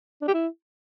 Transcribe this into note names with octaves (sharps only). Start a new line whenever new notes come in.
D4
G4
E4